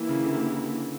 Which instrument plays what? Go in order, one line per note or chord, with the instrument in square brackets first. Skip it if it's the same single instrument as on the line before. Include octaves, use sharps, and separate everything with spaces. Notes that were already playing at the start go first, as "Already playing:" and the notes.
Already playing: [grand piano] E3 [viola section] A#3 E4 G4
[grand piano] C#3
D3